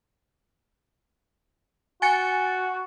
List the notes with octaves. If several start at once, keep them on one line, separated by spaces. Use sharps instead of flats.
F#4 G#5 A6 C#7